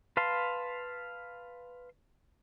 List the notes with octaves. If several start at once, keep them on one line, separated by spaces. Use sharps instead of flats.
B4 F5 A5 C6